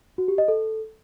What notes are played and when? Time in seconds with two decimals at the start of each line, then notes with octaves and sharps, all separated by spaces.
0.18 F#4
0.28 G4
0.38 D#5
0.48 A4